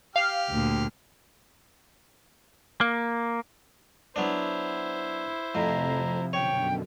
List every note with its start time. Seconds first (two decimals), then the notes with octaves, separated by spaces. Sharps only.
0.16 G4 F5 F6
0.50 D2 A#2
2.81 A#3
4.16 F#3 B3 D4 E4 C5
5.55 F2 A2 C3 F3 A#5
6.33 F#2 B2 D3 C#5 G5